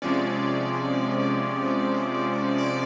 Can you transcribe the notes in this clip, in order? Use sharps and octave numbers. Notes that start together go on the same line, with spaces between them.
C3 F3 G#3 C#4 D5
D5